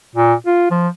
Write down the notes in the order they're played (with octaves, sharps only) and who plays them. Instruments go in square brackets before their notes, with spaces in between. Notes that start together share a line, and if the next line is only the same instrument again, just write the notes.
[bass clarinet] A#2
F4
F3